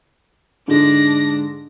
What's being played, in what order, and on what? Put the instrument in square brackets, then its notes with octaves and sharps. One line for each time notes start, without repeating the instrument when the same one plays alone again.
[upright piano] G#2 D3 G#3 [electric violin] D4 A#6